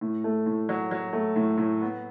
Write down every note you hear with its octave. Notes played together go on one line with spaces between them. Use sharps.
A2
A3
A2
F#3
F#3
A3
A2
A2
B3